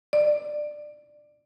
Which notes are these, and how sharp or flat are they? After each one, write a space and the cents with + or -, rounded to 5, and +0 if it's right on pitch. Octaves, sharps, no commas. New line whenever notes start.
D5 +15